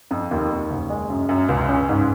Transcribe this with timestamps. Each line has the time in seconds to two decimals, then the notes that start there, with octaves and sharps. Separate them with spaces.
0.11 F2
0.31 D#2
0.50 D#2
0.70 F#1
0.90 G#3
1.10 F#2
1.29 F#2
1.49 C#2
1.69 C#4
1.89 G#2